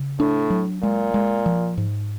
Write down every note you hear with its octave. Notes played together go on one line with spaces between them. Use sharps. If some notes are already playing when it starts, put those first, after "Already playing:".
Already playing: C#3
A2 D4
F#3
A#2 G#3
G#3
F3
G#2